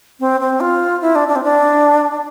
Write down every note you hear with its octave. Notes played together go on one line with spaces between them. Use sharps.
C4
C4
F4
E4
D4
D4
C4
D4